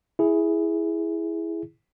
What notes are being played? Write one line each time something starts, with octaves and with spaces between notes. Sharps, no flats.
E4 G#4